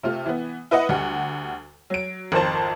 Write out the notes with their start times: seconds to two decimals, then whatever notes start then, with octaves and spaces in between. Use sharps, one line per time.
0.03 C3 A3 F4
0.26 E3 B3
0.71 E4 B4 D#5 F#5
0.89 D2 G3 F#5
1.90 F#3 D7
2.32 G#1 F2 A#4 C5 A5